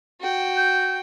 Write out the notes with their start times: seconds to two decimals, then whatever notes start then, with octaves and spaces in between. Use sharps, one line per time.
0.21 F#4 G5
0.57 G6